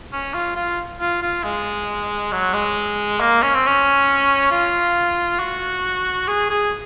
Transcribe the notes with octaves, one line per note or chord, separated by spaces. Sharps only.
C#4
F4
F4
F4
F4
G#3
F#3
G#3
A#3
C#4
C4
C#4
F4
F#4
G#4
G#4